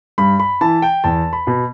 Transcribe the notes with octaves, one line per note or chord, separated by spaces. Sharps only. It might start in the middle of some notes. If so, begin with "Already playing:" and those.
G2 B5
B5
E3 A5
G5
E2 A5
B5
B2